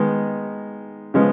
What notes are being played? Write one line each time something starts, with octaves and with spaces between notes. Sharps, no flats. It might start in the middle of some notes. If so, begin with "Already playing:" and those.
Already playing: D#3 G#3 B3 D#4
C#3 F3 G#3 B3